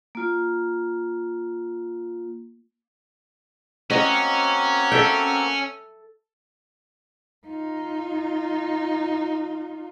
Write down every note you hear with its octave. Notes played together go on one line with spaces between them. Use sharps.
A#3 F4
A#3 C4 C#4 F#4 D#5 F#5
A4 E5 G5
D#4 F4